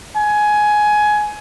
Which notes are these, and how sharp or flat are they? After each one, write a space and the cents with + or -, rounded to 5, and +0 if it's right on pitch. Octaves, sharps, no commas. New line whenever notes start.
G#5 +15